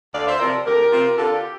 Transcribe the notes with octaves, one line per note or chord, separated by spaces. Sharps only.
D2 D5 F5
C5 E5
C3 F3 C4 F4 A#4 D5
D2 G4 A#4
C3 F3 C4 F4
D3 F4 A4
G4